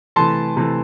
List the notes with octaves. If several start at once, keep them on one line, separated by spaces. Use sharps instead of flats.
C3 E3 A3 A5 C6
C3 E3 A3